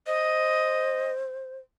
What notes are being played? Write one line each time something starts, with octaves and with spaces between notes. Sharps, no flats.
C5 D#5